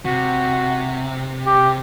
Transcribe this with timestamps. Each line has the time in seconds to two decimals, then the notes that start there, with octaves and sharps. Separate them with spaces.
0.05 C3 F#4
1.46 G4